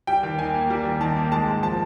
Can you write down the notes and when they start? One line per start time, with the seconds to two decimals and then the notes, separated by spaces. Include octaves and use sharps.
0.07 G3 G5
0.23 D#2
0.39 D#3 G#5
0.54 A#3
0.70 G3
0.85 D#2
1.01 D#3 A5
1.16 A#3
1.32 G#3 A5
1.47 G#2
1.62 F3 A5